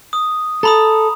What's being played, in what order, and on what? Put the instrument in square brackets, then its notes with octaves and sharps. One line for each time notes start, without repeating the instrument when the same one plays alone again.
[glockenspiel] D#6
[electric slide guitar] A4 [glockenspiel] A#5 B5 D#6